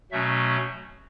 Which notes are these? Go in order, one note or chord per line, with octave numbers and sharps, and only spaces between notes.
B2 F#3 A3 C#4 E5